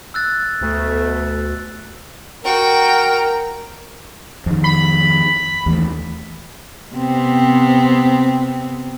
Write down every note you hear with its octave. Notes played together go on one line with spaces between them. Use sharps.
E6 F#6 A6
D2 B2 A3
F#4 A#4 G5
F2 D#3
B5
D#2 E3 A3
C3 B3 C4